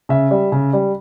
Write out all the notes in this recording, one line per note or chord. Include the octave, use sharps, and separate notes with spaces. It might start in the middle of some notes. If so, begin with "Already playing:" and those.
C#3 E5
G3
C#3
G3